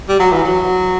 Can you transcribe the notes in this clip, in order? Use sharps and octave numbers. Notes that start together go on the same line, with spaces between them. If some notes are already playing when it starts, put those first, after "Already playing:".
G3
F#3
E3
F#3